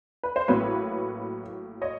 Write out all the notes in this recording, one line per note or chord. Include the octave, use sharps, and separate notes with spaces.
B4
C5
A1 A2 F#3 A#3 B4 C#5
C#5 D#5